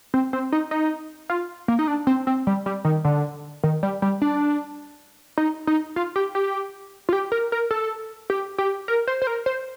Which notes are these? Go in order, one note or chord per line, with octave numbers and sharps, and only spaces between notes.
C4
C4
D#4
D#4
F4
A#3
D#4
D4
C4
C4
G3
G3
D#3
D3
D#3
G3
G3
D4
D#4
D#4
F4
G4
G4
F4
G4
A#4
A#4
A4
G4
G4
A#4
C5
C5
A#4
C5